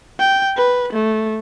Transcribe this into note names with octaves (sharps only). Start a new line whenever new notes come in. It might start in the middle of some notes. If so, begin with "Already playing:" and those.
G5
B4
A3